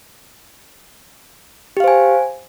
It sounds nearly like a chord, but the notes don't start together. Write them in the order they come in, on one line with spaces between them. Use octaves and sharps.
G4 F5 C5 G#5